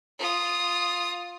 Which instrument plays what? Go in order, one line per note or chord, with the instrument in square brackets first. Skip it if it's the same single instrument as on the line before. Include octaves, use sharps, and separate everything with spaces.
[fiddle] F4 D#6